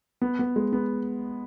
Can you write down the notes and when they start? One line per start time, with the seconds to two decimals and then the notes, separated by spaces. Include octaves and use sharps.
0.21 B3
0.39 B3
0.56 G#3
0.73 B3